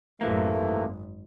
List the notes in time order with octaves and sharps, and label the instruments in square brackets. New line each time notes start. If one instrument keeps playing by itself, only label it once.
[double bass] A1 F#2 [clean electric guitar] C3 E3 A#3 [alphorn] A3
[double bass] G#1